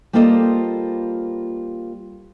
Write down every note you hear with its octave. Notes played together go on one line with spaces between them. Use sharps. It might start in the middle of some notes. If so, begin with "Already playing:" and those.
G3 A#3 F4 A4 C5 D#5